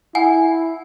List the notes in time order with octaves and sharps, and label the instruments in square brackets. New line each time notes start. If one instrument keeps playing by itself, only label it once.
[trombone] E4 [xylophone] F#5 G#5